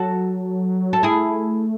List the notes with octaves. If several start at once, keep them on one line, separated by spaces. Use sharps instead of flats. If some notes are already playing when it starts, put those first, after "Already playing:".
Already playing: F#3 F#4 A4
A4
A3 E4 G#4